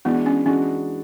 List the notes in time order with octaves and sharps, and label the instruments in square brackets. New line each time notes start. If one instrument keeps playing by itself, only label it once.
[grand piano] E3 G#3 D4 F#4 [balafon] B3
[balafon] C#4
[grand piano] E3 G#3 D4 F#4 [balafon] C#4